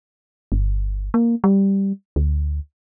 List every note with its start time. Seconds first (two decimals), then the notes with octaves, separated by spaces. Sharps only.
0.52 G1
1.14 A#3
1.44 G3
2.16 D2